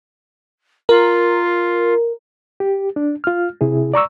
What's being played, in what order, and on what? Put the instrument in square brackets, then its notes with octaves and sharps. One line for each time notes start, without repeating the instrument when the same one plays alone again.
[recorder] F4 [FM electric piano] A#4
[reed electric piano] G4
D4
F4 F6
C3 E4 G#4
D5 A#5 C#6 E6